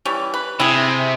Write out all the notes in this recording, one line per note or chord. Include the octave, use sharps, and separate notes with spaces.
E3 G3 C#4
B4
C3 E4 G#4